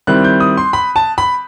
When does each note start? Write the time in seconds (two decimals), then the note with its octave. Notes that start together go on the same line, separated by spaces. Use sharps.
0.07 D#3 G3 C4 E4 F#6
0.24 G6
0.40 D#6
0.57 C6
0.73 B5
0.96 A5
1.18 B5